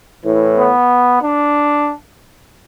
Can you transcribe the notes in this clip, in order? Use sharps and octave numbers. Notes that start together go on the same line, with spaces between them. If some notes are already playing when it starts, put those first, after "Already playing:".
A2 E3
B3
D4